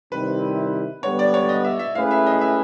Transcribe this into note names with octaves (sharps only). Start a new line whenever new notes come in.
C3 D#3 G3 C4 E4 B4
D3 G3 B3 C#5
D5
C#5
D#5
E5
E5
A3 C#4 E4 G#4 B4 F5
E5
D#5
E5